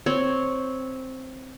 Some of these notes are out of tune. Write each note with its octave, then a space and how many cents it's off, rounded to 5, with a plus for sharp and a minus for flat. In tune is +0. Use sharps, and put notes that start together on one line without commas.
C4 +0 C#5 +0